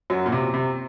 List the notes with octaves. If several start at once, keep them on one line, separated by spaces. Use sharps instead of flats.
F#2 F#3
A#2
C3
C3